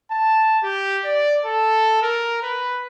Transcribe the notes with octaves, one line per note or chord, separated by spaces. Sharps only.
A5
G4
D5
A4
A#4
B4